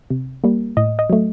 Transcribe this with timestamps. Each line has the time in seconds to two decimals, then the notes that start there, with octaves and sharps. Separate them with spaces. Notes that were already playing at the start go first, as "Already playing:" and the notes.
0.10 C3
0.44 G3 A#3
0.77 A2 D#5
0.99 D#5
1.10 F#3 A3